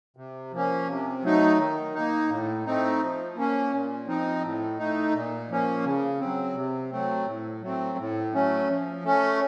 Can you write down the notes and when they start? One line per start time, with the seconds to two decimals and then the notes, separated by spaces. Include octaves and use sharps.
0.17 C3
0.52 F3 A#3 C#4
0.88 C3
1.23 F#3 A3 D#4
1.59 D#3
1.95 A#3 D#4
2.29 A2
2.66 A3 C4 D#4
3.01 F3
3.36 A#3 C#4
3.72 A#2
4.07 F3 C4 D#4
4.43 A2
4.78 A3 D#4
5.14 A#2
5.49 F3 A#3 C#4
5.85 C#3
6.20 F#3 C4
6.55 C3
6.91 F#3 A3 C4
7.27 A2
7.62 F#3 A3 C4
7.98 A2
8.34 F#3 A3 C#4
8.68 F3
9.04 A3 C#4